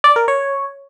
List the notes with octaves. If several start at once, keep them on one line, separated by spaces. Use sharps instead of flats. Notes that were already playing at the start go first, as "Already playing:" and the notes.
D5
A#4
C#5